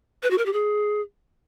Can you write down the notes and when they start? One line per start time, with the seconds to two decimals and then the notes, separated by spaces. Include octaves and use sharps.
0.23 B4
0.30 F#4
0.38 A#4
0.46 G4
0.53 G#4